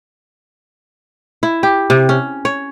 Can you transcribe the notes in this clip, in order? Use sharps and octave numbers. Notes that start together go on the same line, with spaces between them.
E4
G4
C3
C#4
C#5